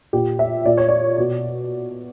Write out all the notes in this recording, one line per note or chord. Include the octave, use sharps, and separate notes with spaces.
A#2 G4
E5
A#2 D5
C#5
D5
B2